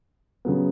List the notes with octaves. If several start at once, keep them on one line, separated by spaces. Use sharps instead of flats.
C#3 F#3 B3